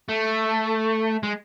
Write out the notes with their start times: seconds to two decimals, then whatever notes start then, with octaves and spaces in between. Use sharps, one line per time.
0.09 A3
1.23 G#3